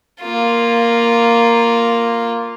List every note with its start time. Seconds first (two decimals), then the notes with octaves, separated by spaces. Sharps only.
0.22 A#3 F4